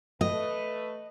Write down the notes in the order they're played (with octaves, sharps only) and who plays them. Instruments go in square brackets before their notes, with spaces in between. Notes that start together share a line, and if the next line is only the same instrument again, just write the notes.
[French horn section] A3 B4 [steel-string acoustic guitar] D#5